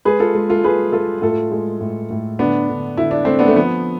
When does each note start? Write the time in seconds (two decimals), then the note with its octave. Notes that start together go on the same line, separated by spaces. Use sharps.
0.05 G#3 G#4 B4
0.20 F4 A4
0.35 G#3
0.49 F4 A4
0.64 G#3 G#4 B4
0.92 G#3 F4 A4
1.22 A2 F4 A4
1.51 G#3
1.81 A2
2.11 A2
2.39 D3 B3 D4
2.69 D3
2.97 D3 E4
3.11 D4
3.25 A3 C4
3.39 B3 D4
3.48 A3
3.56 F3 B3